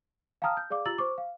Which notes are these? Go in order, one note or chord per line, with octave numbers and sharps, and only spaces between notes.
F5 G5 A5 A#5 D#6 F6
G6
G#4 D5 F5 D6
F4 G4 A#5 E6 A6 F#7
C5 C#6 D6
F5